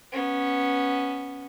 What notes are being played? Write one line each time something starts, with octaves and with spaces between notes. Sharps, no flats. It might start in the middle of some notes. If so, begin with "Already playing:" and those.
B3 C#4